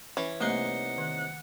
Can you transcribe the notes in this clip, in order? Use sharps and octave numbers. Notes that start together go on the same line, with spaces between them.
E3 C#4
C2 A3 A#3 D#4 F#5 C6
D#3